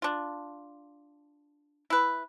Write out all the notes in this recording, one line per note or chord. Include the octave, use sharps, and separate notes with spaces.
D4 F4
E4 B4